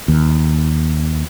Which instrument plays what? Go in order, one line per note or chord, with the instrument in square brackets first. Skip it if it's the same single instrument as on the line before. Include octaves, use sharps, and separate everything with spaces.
[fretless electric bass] D#2